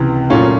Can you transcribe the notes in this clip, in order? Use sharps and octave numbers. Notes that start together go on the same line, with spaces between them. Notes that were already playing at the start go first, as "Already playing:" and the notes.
Already playing: C#2 C3 E3
A#2 F#3 A3 C#4 F4